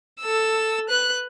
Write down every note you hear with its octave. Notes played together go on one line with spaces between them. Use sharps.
A4 E6
B4 F#6